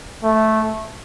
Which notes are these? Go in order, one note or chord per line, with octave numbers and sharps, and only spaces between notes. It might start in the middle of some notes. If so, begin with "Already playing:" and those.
A3